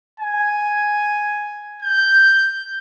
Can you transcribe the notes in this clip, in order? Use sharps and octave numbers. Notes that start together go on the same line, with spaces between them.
G#5
G6